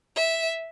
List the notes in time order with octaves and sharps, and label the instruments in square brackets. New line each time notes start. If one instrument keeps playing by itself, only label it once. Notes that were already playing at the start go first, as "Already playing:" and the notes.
[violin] E5